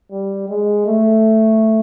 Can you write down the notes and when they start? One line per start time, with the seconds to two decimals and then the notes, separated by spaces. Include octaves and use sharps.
0.11 G3
0.49 G#3
0.86 A3